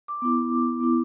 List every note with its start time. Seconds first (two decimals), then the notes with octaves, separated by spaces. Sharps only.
0.08 D6
0.22 B3 E4
0.81 B3 E4